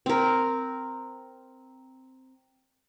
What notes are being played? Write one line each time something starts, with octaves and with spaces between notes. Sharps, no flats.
C4 A#4